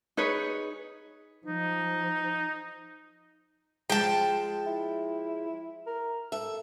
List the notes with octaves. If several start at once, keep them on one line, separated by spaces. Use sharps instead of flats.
D#4 G#4 B4 C#5
F3 D#4
F3 G#3 G5 A5
E4
A#4
A4 E5